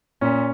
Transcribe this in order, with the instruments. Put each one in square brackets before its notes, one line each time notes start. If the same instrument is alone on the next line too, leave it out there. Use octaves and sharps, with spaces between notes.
[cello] A#2 [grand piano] C#4